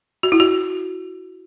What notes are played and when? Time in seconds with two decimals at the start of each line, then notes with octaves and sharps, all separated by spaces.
0.23 F#4
0.32 E4
0.40 F#4